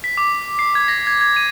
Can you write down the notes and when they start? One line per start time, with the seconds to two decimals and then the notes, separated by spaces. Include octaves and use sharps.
0.04 B6
0.17 D6
0.59 C7
0.75 G#6
0.88 A#6
1.07 G#6
1.21 G#6
1.36 D#7